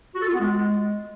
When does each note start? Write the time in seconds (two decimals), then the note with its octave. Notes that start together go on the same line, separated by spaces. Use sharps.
0.15 F#4
0.21 A4
0.27 F4
0.33 B3
0.40 G#3